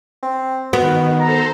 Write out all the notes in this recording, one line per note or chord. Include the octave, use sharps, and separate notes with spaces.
C4
D#3 B3 F#4
A4 C5 A#5